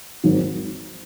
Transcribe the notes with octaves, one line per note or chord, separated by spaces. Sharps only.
G#1 G#2 D#3 F#3